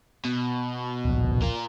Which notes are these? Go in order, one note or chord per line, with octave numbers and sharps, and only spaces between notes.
B2
D1 A#1
F4 A#4